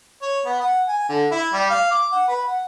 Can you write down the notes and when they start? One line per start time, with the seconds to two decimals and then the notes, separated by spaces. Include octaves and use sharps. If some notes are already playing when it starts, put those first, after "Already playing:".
0.22 C#5
0.45 B3
0.61 F#5
0.88 G#5
1.09 D3
1.31 E4
1.53 G3
1.70 F5
1.91 D6
2.12 F#5
2.28 B4
2.47 F#5